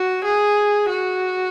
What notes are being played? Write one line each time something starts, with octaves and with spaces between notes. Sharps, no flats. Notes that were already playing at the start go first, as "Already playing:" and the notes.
Already playing: F#4
G#4
F#4